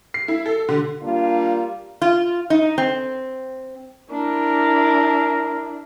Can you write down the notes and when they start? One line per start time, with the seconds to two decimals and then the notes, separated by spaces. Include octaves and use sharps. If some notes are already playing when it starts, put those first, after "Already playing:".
0.14 C7
0.28 E4
0.46 A4
0.69 D3
1.02 G3 A#3 D4 F4
2.02 F4
2.50 D#4
2.78 C4
4.11 D4 E4 A#4